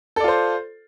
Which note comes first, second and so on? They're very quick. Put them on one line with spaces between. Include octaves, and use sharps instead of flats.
A4 D5 F4 C5